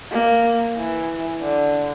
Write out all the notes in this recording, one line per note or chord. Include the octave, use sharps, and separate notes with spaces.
A#3
E3
D3